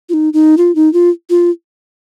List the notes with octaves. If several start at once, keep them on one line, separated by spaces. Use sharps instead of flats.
F4
D#4
D#4
F4
D#4
F4
F4